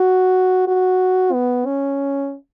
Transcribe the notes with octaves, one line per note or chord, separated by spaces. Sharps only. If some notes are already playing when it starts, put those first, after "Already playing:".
Already playing: F#4
F#4
B3
C#4